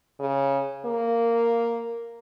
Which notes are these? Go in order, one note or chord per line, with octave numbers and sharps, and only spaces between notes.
C#3
A#3